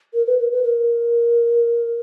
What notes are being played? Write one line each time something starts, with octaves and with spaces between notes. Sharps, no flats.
A#4
B4
A#4
B4
A#4